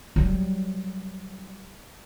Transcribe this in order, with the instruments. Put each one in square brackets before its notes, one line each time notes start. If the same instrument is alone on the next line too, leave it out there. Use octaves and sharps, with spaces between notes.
[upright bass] F#3 G3